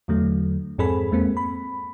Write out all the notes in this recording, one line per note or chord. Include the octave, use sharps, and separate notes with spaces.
E2 D3 F#3 A3
F2 G#2 C4 G#4 A4 B5
E2 G#3 A#3 C4
B5